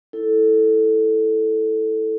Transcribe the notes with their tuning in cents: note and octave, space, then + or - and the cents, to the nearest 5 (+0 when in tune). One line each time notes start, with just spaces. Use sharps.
E4 +0 A4 +0